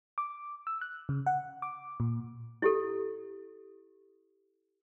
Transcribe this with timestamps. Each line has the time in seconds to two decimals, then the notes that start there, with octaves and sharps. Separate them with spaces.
0.18 D6
0.67 E6
0.81 F#6
1.09 C#3
1.26 F#5
1.62 D6
2.00 A#2
2.62 E4 G4 A4